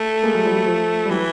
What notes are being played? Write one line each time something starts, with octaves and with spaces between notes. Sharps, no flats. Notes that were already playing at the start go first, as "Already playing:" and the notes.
Already playing: A3
G#3 A#3
F#3 G#3
F3 G3
F#3
F3
G3
E3 F#3